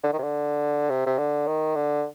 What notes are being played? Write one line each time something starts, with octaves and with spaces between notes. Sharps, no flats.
D3
D#3
C3
D3
C3
C3
D3
D#3
D3